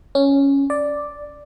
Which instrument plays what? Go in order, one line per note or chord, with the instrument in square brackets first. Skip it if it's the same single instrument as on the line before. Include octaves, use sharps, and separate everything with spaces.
[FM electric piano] C#4
D5